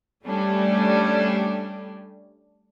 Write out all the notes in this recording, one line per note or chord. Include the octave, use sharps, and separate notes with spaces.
G3 A3 C#4 D4 G4